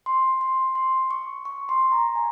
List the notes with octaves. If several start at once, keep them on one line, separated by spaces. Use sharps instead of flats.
C6
C6
C6
C#6
C#6
C6
A#5
G#5